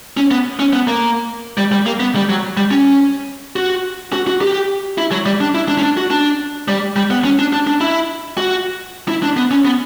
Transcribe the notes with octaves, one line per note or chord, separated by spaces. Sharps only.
C#4
B3
C#4
B3
A#3
G3
G3
A#3
B3
G3
F#3
G3
C#4
F#4
F#4
F#4
G4
E4
F#3
G3
D4
E4
D4
C#4
D4
F#4
D4
G3
G3
B3
C#4
D4
D4
D4
E4
F#4
E4
D4
B3
C#4
B3